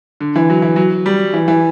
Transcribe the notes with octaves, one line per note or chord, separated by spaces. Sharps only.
D3
E3
F#3
E3
F#3
G3
E3
E3